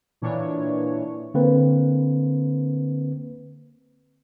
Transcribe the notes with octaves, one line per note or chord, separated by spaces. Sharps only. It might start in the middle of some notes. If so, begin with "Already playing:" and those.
A#2 E3 D4 C#5
D3 A#3 C4 B4